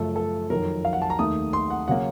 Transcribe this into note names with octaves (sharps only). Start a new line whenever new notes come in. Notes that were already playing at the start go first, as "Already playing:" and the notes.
Already playing: F#2 C#3 F3 A3 A4
A4
F2 D#3 F#3 A#4
F5
F#5
A5
A#5
D#2 D#3 A3 D#6
C6
F#5
C#3 F#3 A#3 C#4 F#5